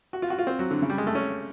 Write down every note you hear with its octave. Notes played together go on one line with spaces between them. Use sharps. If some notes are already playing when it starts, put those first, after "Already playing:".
F#4
F4
F#4
F4
C4
F#3
D3
C#3
G3
G#3
A3
C#4